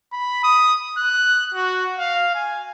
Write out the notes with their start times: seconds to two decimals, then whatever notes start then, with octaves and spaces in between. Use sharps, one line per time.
0.13 B5
0.44 D#6
0.98 F#6
1.54 F#4
1.99 F5
2.35 G#5